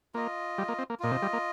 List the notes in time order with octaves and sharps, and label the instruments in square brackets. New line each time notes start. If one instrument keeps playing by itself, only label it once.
[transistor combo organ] A#3 [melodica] F4 D#5
[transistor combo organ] G3
A#3
C4
A#3
[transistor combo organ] A#2 [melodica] F4 D#5
[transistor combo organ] C3
G3
A#3